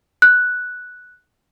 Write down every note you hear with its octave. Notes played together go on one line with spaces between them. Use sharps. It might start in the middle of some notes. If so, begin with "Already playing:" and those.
F#6